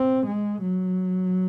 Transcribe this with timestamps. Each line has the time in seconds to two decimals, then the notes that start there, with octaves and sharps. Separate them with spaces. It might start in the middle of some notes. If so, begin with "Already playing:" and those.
Already playing: C4
0.27 G#3
0.62 F#3